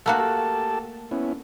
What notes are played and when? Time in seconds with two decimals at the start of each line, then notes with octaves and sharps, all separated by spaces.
0.06 A3 A#3 F#4 F#5 A5
0.20 G4 A4 A5
1.11 B3 C#4 E4